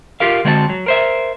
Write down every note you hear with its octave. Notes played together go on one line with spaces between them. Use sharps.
F4 G4 A#4 F5
D3 G#3 C4 F#4 C#5 A5
F#3
A#4 C5 E5